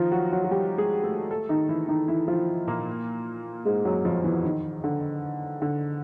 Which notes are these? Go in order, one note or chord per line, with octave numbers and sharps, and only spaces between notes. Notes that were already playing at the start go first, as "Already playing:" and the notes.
Already playing: D#3 F3 D#4 F4
F#3 F#4
F#3 F#4
F#4
G3 G4
G#3 G#4
A3 A4
A3 A4
D#3 D#4
E3 E4
D#3 D#4
E3 E4
F3 F4
A#2 A#3
G#2 G#3
F#2 F#3
F2 F3
E2 E3
D#3
D3
D3